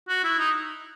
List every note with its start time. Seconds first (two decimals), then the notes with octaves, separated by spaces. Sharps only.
0.08 F#4
0.24 E4
0.39 D#4